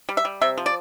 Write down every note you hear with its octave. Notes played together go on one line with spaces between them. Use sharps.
G3
E5
G3
C3 E5
F3
D5